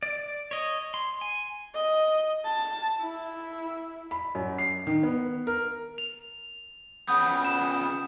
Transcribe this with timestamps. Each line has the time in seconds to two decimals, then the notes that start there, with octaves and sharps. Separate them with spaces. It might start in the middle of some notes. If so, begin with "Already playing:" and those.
0.03 D5
0.51 C#5 D#5
0.94 C6
1.21 G#5
1.74 D#5
2.45 A5
3.01 E4
4.11 B5
4.35 F#2
4.58 C7
4.87 D#3
5.03 B3
5.47 A#4
5.98 F7
7.08 C#3 B3 D#6 G6
7.45 E7